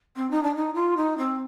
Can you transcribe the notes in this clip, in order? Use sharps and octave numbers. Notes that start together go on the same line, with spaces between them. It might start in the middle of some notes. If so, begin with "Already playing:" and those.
C4
D#4
D4
D#4
F4
D#4
C4